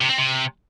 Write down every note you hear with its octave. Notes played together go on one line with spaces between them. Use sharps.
C3
C4
C3